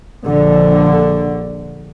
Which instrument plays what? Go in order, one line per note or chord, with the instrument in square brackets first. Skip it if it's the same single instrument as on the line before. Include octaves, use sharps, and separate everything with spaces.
[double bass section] A#1 D3